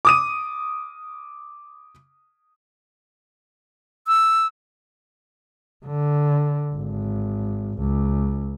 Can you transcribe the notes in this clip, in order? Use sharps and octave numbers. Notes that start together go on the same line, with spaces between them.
D6 D#6 D#7
E6
D3
G#1
C#2